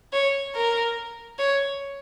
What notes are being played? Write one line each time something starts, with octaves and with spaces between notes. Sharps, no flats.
C#5
A#4
C#5